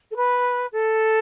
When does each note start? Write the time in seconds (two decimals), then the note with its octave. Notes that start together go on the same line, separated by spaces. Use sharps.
0.11 A4
0.16 B4
0.72 A4